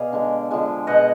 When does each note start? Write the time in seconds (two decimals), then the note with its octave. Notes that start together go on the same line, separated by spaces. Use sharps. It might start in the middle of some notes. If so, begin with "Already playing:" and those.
Already playing: B2 G#4 D5 F5
0.13 D3 G#3
0.51 D3 F3 G#3
0.87 B2 G#3 D#5 F#5